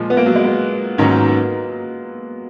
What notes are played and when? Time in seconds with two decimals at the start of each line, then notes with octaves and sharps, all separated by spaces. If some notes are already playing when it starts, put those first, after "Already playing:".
Already playing: A#2 F3 G#3
0.10 B3
0.17 A#3
0.26 F#3
0.35 G#3
0.44 A#3
0.98 G#2 D#3 F#3 A#3 C#4